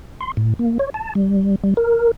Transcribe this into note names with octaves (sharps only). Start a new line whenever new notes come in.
C6
A2
A#3
C#5
A5
G3
G3
A#4